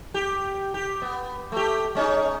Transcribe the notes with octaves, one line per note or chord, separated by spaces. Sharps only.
G4
G4
B3
A3 G4
G#3 C#4 D#4